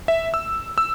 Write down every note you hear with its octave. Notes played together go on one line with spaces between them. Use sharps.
E5
E6
E6